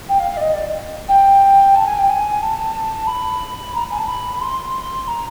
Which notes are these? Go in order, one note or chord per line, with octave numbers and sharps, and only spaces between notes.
G5
F5
F5
D5
D#5
D5
G5
A5
G#5
G5
G#5
A5
B5
A#5
G#5
A5
B5
B5
C6
A#5